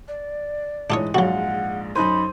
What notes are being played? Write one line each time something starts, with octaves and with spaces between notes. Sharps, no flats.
D5
G#2 E3 D4 F4 C#5 D#6
A#1 G#2 F#3 F#4 F5 F#5
F#2 D#4 C5 B5 D#7